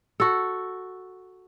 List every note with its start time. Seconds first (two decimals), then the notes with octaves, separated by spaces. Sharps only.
0.20 F#4 A4